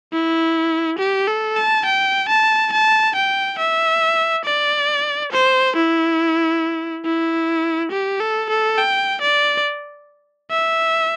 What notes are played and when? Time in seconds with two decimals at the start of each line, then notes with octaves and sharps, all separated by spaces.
0.12 E4
0.98 G4
1.28 A4
1.56 A5
1.85 G5
2.29 A5
2.72 A5
3.15 G5
3.58 E5
4.45 D5
5.32 C5
5.76 E4
7.05 E4
7.91 G4
8.20 A4
8.50 A4
8.78 G5
9.21 D5
10.51 E5